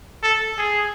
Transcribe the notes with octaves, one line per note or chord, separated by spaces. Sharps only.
A4
G#4